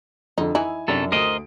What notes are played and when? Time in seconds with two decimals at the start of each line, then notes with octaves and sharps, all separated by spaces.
0.38 F2 D3 D#4
0.55 E3 D#4 E4 G#5
0.88 F#2 C3 F#3 D4 A4
1.12 D2 A#4 C5 D#5 D#6 D7